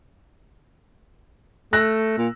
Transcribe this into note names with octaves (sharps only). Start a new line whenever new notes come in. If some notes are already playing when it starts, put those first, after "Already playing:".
A3 E6 F#6 A#6
A#2